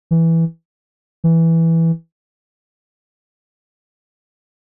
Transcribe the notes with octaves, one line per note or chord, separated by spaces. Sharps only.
E3
E3